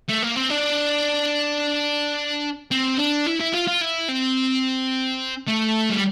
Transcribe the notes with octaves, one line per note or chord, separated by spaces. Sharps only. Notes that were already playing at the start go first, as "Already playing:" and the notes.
A3
A#3
C4
D4
C4
D4
E4
E4
F4
F4
E4
C4
A3
G3